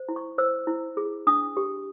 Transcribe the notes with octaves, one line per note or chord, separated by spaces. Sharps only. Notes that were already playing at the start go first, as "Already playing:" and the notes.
Already playing: C5
E4
C#6
C5 E6
E4
G#4
D4 D#6
G4